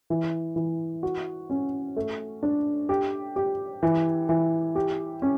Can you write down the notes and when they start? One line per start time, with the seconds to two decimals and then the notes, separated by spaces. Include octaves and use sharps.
0.10 E3
0.56 E3
1.03 F#4
1.50 C#4
1.97 A3
2.43 D4
2.89 G4
3.36 G4
3.83 E3
4.29 E3
4.75 G4
5.22 C#4